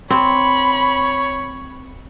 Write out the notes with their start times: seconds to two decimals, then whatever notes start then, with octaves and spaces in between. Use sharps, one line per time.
0.10 C4 C#5 B5